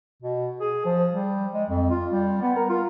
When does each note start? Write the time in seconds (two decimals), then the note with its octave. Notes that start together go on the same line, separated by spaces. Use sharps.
0.22 B2
0.60 G#4
0.85 F3
1.12 G3
1.54 G#3
1.70 F2
1.90 F4
2.11 G3
2.42 B3
2.56 A#4
2.70 F4